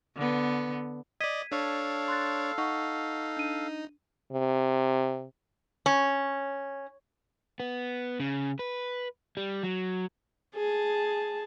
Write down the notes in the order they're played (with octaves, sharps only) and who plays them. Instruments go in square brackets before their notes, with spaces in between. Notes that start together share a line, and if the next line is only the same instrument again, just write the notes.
[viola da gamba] D3 B3
[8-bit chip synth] D5 D#5 [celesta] G#6 B6 D#7
[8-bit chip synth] D4 C#5 [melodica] A4 F5
[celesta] C6 F#6 A6
[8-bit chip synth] D#4 [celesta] F#5 C#6
[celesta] D4 D#7
[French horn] C3
[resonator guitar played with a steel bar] C#4
[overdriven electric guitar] B3
C#3
B4
G3
F#3
[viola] G#4 A5